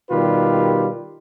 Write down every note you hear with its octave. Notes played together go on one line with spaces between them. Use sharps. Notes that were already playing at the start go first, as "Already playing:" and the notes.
B2 D#3 G3 F4 G4 B4